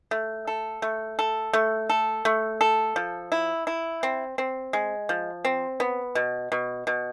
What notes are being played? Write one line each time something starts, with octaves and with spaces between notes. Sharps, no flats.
A3
A4
A3
A4
A3
A4
A3
A4
F3
E4
E4
C4
C4
G#3
F3
C4
B3
B2
B2
B2